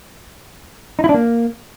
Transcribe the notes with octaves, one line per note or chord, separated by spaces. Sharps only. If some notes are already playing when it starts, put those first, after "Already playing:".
D#4
E4
D4
A#3